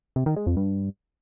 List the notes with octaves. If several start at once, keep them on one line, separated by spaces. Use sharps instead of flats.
C3
D#3
G#3
F2
G2